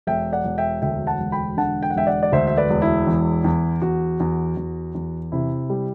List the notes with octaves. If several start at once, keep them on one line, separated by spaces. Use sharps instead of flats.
E1 E5 G5
D5 F#5
E1
E5 G5
D2 E5 G5
F#5 A5
E1
G5 B5
D3 F#5 A5
G5
F#5
E1 E5 G5
D5 F#5
D5
D2 C5 E5
E5
B4 D5
E1
E4
E2
E2
E2 F#4
E2
E2
E2
C3 E4
G3